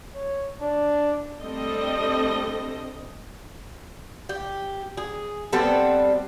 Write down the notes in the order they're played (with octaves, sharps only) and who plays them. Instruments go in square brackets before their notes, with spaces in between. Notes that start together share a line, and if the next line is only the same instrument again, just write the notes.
[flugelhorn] C#5
D4
[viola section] G3 A3 C4 D4 A4 D#5
[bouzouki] G4
G#4
G3 B3 C4 A4